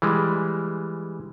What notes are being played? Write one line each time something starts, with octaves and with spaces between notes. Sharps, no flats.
E3 G3 G#3